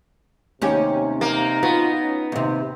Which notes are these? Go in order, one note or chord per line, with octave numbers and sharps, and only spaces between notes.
D#2 C3 C#4 G4
A#3 D#4
B3 F4 F#4
C#4
D#2 C3 C4